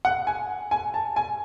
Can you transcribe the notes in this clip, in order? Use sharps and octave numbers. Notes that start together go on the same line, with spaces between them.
F#5
G#5
G#5
A5
G#5